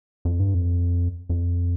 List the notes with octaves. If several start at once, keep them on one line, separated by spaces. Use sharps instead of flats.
F2
G2
F2
F2